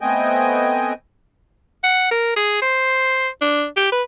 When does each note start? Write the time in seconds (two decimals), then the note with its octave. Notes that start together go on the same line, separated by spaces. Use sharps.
0.01 A3 B3 C4 D#5 G5 G#5
1.84 F#5
2.11 A#4
2.36 G#4
2.62 C5
3.41 D4
3.77 G4
3.92 B4